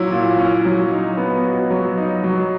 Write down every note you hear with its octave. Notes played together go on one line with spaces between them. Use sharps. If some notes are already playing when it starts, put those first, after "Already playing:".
Already playing: A#2 F#3 C#4 E4
A#2
C#4
F#3
D#4
B3
F#4
F#3
D#4
F#3